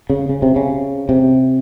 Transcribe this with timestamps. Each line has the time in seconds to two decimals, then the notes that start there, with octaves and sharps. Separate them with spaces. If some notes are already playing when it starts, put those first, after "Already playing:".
0.10 C#3
0.29 C#3
0.42 C3
0.56 C#3
1.09 C3